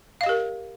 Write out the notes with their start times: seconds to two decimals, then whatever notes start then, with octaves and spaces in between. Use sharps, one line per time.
0.21 F5
0.24 D#5
0.26 G4
0.29 A#4